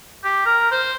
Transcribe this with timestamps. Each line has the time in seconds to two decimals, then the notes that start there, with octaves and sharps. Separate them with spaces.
0.24 G4
0.46 A#4
0.72 C5